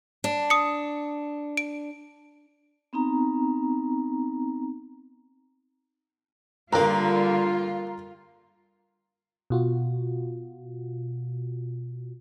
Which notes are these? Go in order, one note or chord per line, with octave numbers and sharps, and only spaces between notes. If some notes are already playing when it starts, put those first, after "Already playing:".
D4
D#6 C#7
D7
B3 C4 D#4 A#5
G2 D3 G3 A#3 F4 A#4 A#5
B2 F4 F#4